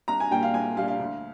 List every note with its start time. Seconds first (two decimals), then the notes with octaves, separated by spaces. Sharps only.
0.08 C2 A#5
0.20 G#5
0.31 A#2 G3 A#3 G5
0.43 F5
0.54 C2 G#5
0.76 A#2 G3 A#3 F5
0.88 F5
0.99 D2